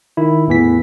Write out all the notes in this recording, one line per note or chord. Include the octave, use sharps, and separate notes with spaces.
D#3 E4
E2 A2 E3 B3 B6